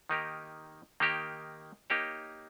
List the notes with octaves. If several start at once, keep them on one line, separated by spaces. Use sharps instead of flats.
D#3 A#3 D#4 G4 A#4
D#3 A#3 D#4 G4 A#4
A#3 D#4 G4 C#5